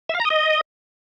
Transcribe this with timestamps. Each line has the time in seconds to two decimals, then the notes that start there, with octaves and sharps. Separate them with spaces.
0.09 E5
0.15 F5
0.20 A#5
0.25 D#6
0.30 D#5